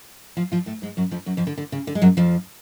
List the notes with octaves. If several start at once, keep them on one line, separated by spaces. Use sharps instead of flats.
F3 F4
F3 F4
A2 A3
G#2 G#3
F#2 F#3
F2 F3
F#2 F#3
F2 F3
D3
D3
C#3
D3
G#3
F#2 F#3
F2 F3